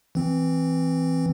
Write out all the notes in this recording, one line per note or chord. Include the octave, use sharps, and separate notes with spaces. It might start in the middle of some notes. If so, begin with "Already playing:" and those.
E3 C4